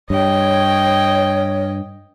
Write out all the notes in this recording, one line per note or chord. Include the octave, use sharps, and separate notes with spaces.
G2 C#5 D#5 G5